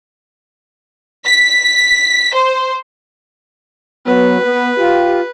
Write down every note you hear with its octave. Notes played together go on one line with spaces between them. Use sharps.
B6
C5
F#3 B3 B4
B3
F4 G4